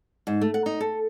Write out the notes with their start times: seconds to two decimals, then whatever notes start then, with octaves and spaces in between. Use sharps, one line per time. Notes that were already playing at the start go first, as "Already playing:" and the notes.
0.27 G#2
0.41 A3
0.54 F#5
0.66 D#4
0.80 A4